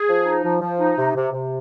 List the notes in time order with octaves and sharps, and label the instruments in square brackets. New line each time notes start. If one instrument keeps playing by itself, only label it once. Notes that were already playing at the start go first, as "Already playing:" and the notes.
Already playing: [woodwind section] G#4
F3
D#4
F3
F3
D#4
C3
C3
C3